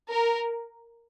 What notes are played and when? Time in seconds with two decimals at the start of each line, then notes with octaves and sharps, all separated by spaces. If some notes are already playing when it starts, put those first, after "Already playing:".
0.11 A#4